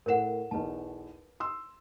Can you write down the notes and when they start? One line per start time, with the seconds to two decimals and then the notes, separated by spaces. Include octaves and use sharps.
0.06 A2 A#4 C5 F#5 E7
0.51 B1 E2 B4 A5
1.40 C6 E6